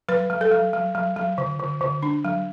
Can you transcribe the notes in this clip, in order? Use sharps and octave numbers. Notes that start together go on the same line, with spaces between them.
F#3 B4
F#3
A4
F#3
F#3
F#3
F#3
D3
D3
D3
D4
F#3